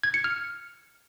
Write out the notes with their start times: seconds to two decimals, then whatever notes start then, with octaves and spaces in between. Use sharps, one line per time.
0.03 G#6
0.14 C#7
0.24 F6